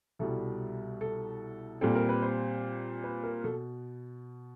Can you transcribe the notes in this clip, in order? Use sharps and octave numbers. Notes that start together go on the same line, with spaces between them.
C2 B2 G3 A4
A4
A#2 G3 C4 A4
A#4
B4
C5
B4
A#4
B2 A4